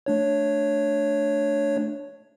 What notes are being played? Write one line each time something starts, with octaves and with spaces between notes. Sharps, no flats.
A3 D4 C#5